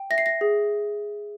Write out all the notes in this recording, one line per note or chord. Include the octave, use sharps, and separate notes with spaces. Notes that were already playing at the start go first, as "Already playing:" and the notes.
Already playing: G5
E5 A#6
C7
A#6
G#4